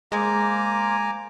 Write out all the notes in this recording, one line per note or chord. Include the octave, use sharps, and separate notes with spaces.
G#3 A#3 C5 G#5 A#5 D6